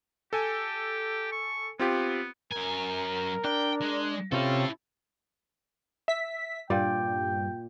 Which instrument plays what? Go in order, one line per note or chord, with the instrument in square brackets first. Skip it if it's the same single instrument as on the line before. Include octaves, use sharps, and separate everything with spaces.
[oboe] G4 [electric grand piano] A4 G#5
[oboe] C#6
[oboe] B3 [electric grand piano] C4 F4 G4
[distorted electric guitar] F#2 G#5 [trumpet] A#4
[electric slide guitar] D4 [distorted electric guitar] G5
[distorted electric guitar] G#3
[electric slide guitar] C3 C#4 G4 [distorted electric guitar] E4 A4 [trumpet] F4
[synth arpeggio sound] E5 B6
[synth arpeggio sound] G2 [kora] A#2 D5 [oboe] G5